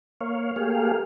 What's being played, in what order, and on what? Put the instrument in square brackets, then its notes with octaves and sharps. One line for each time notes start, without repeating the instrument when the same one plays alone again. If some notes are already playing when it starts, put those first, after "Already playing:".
[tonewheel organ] A#3 C#5 F5
A3 A#3 G4 G#4 F5